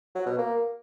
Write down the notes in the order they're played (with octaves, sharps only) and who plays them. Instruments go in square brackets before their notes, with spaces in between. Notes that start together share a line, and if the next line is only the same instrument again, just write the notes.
[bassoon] F#3
B2
A#3